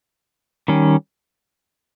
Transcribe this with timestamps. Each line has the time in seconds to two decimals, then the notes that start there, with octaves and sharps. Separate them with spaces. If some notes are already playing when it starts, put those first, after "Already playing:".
0.68 D#3 G3 C#4